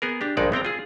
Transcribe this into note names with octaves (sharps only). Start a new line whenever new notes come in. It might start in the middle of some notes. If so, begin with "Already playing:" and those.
B3 G#4 A#4
D4 G4
A#1 G2 G#3 D#4 D5
B3 C4 G5 A#5
F4 G#4